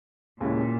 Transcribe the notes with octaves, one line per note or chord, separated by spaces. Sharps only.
D#2 A#2 C#3 G#3 C#4 E4